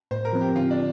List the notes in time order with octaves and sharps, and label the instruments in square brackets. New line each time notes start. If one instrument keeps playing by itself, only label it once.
[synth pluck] A2 [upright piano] C5
[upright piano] A#4
[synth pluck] F3 C4
[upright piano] G4
[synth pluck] D3 [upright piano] F4
[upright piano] D4